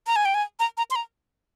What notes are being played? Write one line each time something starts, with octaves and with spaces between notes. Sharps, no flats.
A#5
G#5
G5
G#5
A#5
A#5
C6
A#5